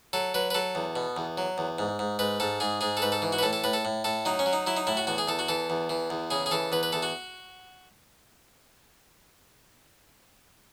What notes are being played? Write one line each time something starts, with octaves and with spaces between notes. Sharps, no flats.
F#3 A4
F#3 B4
B4
F#3 A4
E2
B2
E2
F#3
E2
G#2
G#2
G#2 B4
G#2 A4
G#2 G#4
G#2 G#4
A4
G#2 B4
A4
E3
F#4
B4
A2 A4
A4
A2 B4
A4
A2
A2 A4
F#3 D#4
C#4
F#3
D#4
F#3 E4
D#4
A2 E4
F#4
E2 F#4
G#4
E2 A4
F#4
E3 A4
E2
E3
E2
C#3 G#4
G#4
E3 A4
E2 B4
B4
E2 A4
F#4